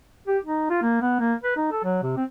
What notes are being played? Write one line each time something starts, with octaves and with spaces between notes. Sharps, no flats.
G4
D#4
F4
A#3
B3
A#3
B4
D#4
A4
F#3
C3
C4